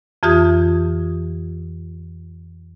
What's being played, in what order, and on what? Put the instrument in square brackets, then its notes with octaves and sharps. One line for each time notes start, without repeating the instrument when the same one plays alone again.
[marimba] F2 E3 F4 G4 D#6 G#6